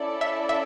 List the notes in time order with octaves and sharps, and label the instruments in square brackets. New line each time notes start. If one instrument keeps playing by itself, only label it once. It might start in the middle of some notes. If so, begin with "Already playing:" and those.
Already playing: [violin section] C#4 E4 A4 D5
[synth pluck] E5
E5